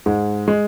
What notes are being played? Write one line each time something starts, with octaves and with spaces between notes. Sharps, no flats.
G#2 G#3
G#3